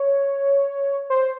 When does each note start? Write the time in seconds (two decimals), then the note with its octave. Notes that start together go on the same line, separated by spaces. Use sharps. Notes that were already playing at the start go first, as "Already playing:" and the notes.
Already playing: C#5
1.10 C5